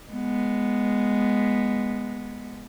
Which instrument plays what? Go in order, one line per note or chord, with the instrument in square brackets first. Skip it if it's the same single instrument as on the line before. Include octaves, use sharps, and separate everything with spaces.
[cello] G#3 B3